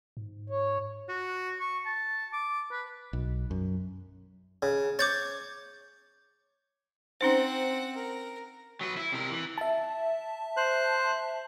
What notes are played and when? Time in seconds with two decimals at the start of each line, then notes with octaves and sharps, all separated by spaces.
0.17 G#2
0.50 C#5
1.09 F#4
1.60 C#6
1.86 A5
2.33 D6
2.71 B4
3.13 B1
3.51 F#2
4.63 C#3
4.99 C#5 D6 G6 A6
7.21 C4 C#4 D#4 C5 F#5
7.95 A#4
8.81 F#3 B4
8.97 E4
9.12 C3 A#4
9.31 E3
9.58 E5 A5
10.57 C5 F#6